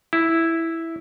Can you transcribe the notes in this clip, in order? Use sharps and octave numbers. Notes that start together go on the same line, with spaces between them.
E4